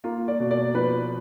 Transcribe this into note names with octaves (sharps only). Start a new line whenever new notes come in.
A#3 F4
D5
B2
D5
F3 B4